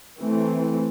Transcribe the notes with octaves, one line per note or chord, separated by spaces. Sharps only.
E3 A3 C4